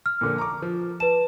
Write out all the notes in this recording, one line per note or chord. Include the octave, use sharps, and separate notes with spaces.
F6
A#2 D3 F3
A#5 C#6 D6
F3
B4 A5 E7